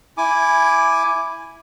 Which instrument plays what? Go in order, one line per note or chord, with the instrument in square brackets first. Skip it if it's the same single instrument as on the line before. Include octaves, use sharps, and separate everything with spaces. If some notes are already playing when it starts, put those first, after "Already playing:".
[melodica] E4 G#5 D6